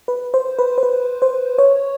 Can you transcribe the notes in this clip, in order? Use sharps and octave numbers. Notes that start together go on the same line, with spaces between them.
B4
C5
B4
C5
B4
C5
C#5